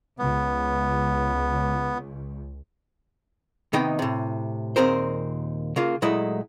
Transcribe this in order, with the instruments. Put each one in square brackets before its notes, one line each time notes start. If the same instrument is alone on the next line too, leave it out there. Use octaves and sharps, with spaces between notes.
[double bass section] C#2 [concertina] B3
[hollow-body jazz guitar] C3 D#3 B3 D#4 D#5 G5
A2 C3
D#2 A#2 C4 G#4 A#4 C5
C#3 A#3 F4
A#2 F#3 G#3 A3 E4 D#5